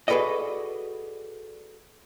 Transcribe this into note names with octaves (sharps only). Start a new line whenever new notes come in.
F#4 G#4 A4 B4 D5 D#5